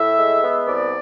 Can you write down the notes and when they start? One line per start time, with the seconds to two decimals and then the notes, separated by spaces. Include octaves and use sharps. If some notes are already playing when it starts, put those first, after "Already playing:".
Already playing: A2 E5
0.17 G#3
0.43 B3
0.67 C2 D5